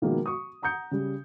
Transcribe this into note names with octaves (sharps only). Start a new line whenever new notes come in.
B2 D#3 F3 G#3 A#3 B3
C#6 D#6
F#5 A#5 D#6 G6 C#7
C#3 G3